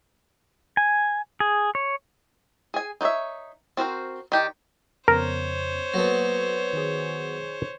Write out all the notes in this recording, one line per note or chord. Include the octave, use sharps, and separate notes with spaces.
G#5
G#4
C#5
G#4 G#5
D#4 E4 F#4 C#5 E5
C4 F#4 A#4 C5
D#3 G4 D5
F2 C#3 B3 A#4 C5 C#5
F#3 A#3 B3 F#4 A4
D#3 G#4